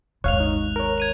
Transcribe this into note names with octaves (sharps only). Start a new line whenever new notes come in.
G#1 D#2 C#5 F5 F#6 F7
D#4
A#4 C#5
G#6 D#7 F7